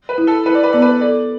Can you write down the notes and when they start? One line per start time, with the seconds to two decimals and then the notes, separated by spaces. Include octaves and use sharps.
0.09 B4
0.18 E4
0.27 A4
0.46 E4 B4
0.55 D5
0.63 B4
0.73 B3 D5
0.82 B4
1.01 A4 D5